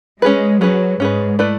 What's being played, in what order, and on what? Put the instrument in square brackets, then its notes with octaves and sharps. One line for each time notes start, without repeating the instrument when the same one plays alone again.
[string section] G#3 [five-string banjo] C#4 G#4 B4
[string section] F#3 [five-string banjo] C#4 G#4 B4
[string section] G#2 [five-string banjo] C#4 G#4 B4
[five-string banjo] A3 E4 B4 D5